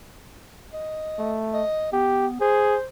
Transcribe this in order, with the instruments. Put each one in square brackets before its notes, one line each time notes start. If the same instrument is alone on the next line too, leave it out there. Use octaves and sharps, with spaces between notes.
[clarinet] D#5
[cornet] A3
[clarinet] D#5
[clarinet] B3 [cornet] G4
[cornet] G#4 [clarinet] C5